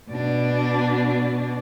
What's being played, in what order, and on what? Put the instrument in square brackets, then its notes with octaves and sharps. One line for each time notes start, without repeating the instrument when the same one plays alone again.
[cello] B2 D4